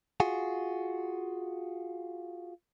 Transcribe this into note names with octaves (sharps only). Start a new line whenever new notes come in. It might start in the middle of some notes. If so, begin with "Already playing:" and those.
F4 F#4 G#4